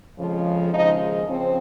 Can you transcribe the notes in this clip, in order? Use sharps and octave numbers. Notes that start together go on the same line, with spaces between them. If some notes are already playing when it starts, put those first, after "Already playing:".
F2 C#3 F3 G#3
D#2 C#3 F3 G#3 D#4
C#3 F3 C4